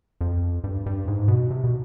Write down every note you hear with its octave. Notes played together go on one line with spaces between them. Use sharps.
F2
G2
G2
G#2
B2
C3
B2